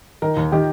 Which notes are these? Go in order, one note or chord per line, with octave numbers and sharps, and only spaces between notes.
D#3 A#4
D#2
D#3 G4